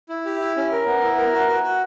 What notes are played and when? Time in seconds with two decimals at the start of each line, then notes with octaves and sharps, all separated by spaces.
0.09 E4
0.25 G4
0.40 E4
0.56 C#4
0.72 A#4
0.86 B3
1.02 E4
1.17 A#4
1.33 F#4
1.48 F#4
1.63 F#4